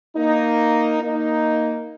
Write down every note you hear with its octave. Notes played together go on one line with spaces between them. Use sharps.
A#3 D#4
A#3 D#4